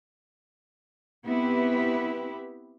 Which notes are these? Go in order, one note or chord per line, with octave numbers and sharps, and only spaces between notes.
B3 C4 E4 G4 B4